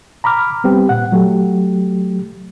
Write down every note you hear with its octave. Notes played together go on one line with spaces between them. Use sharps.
A#5 B5 D6 F6
G3 B3 C4 G4
A#2 F#5
F#3 A3 G4